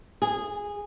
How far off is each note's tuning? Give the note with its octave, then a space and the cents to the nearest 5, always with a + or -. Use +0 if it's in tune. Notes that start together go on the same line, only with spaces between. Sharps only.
G#4 -15